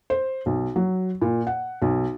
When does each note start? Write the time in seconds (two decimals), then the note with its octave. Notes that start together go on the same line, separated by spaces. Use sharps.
0.10 C5
0.46 B1
0.76 F#3
1.22 A#2
1.47 F#5
1.82 B1